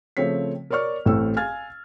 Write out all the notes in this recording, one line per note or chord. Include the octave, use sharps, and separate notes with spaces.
C#3 F3 A3 C4 C#5 B6
A#4 C#5 D5 C#6 F6
A1 A2 C4 A4 E6
F5 G#5 F6 G#6 A6